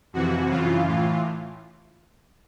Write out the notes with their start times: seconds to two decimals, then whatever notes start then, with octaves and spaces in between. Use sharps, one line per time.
0.13 F2 C3 E3 F#4
0.50 F#2 C#3 E3 F4
0.87 A2 E3 F4